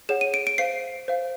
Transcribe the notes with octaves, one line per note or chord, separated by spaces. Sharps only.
G#4 C#5 F#5 E7
D#7
D7
D7
C5 F5 C7
C5 F5